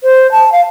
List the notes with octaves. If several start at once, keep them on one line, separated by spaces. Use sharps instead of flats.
C5
A5
F5